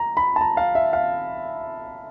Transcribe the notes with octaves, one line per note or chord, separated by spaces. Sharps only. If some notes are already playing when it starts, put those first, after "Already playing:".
Already playing: A#5
B5
A5
A#5
F5
E5
F5